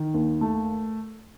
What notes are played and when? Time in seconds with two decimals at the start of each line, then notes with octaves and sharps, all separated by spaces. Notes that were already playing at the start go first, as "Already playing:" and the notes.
Already playing: D#3
0.14 D#2
0.41 A3